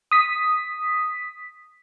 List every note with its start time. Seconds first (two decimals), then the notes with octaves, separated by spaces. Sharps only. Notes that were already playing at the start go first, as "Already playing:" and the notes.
0.11 D#6 B6